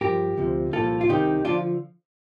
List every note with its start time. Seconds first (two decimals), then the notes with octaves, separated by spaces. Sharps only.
0.01 G2 F3 G4 A#4
0.37 D2 C3 F3
0.73 C2 A#2 F3 F4 A4
1.01 F4
1.08 C2 C3 D#3 D#4 G4
1.45 D3 F3 D4 F4